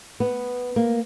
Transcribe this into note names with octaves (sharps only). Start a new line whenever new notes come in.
B3
A#3